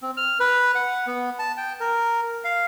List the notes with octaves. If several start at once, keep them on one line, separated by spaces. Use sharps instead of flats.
C4
F6
B4
F#5
B3
A5
G5
A#4
F5